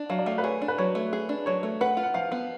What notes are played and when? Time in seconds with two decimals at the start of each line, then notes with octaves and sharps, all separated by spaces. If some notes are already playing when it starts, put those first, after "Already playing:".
Already playing: D4
0.10 F#3 F5
0.19 D5
0.26 A3 F5
0.38 B4
0.44 G#4 C#5
0.62 D4
0.68 B4
0.78 F#3 C#5
0.95 A3
1.13 G#4
1.29 D4
1.46 F#3 C#5
1.63 A3
1.81 B4 F#5
1.97 F4
2.03 F#5
2.14 F3 F5
2.32 B3